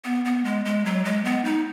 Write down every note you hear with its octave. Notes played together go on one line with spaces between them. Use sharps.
B3
B3
G#3
G#3
F#3
G#3
B3
D#4